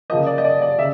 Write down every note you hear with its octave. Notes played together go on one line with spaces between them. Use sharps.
C#3 F3 A#3 D#5
D5
D#5
D5
D5
C#3 E5